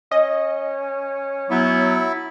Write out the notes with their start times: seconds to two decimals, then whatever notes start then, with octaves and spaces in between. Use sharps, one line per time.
0.11 C#4 D#5
1.50 F#3 B3 E4